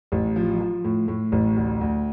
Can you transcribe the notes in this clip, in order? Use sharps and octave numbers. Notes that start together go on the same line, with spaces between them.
A1
F3
F3
A2
A2
A1
D2
D2